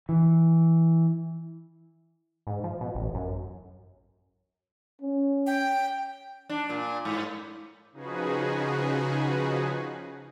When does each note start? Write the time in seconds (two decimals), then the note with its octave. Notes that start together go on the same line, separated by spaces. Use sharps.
0.09 E3
2.47 G#2
2.64 F3
2.81 B2
2.95 A1
3.15 F#2
5.02 C#4
5.47 G5
6.50 D4
6.69 A#2
7.05 G#2
7.92 C#3 F3 D#4 F#4 G#4 B4